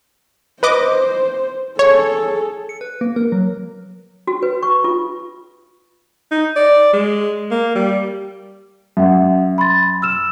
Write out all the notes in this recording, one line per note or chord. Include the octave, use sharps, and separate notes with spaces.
B4 C5 D#5 D6
G#4 A4 C#5
C#7
B4
A#3
A#4
F#3
F#4
B4
C#6
F4
D#4
D5
G#3
A#3
G3
F#2 E5 F#5
B5 C6 A6
E6 F6 E7